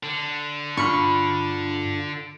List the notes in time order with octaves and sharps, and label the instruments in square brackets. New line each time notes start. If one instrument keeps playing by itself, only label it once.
[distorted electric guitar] D3
[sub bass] G2 [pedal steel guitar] D4 F4 F6 [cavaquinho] B5 C#6